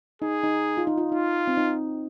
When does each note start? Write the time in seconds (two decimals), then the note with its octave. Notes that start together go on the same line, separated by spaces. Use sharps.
0.22 D#4 G#4
0.44 D#4
0.77 F4
0.87 D#4
0.98 F4
1.12 D#4 F4
1.48 C4
1.57 D#4